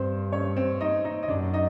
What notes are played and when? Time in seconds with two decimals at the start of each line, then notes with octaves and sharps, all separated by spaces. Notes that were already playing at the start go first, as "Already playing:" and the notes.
Already playing: G2 C4 C5
0.32 C#4 C#5
0.57 C4 C5
0.81 D#4 D#5
1.04 D#4 D#5
1.23 D#5
1.29 F#2 D4 D5
1.53 D#4 D#5